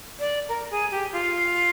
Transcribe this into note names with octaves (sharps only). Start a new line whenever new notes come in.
D5
A#4
G#4
G4
F4